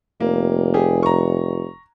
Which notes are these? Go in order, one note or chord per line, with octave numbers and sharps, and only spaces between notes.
F1 A#3
G4 G#4
A#5 C#6